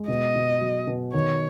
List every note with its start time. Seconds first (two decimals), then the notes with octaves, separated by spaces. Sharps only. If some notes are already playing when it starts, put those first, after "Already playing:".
Already playing: G#3
0.08 B2 D#5
0.36 B2
0.61 F#3
0.87 B2
1.14 D#3 C#5